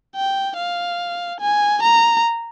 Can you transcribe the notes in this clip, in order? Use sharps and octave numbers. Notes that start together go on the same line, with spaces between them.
G5
F5
G#5
A#5